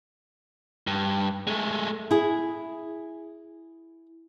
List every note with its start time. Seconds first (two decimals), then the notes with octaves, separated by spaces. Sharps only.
0.87 G2
1.47 G#3 A3
2.11 E4 G#4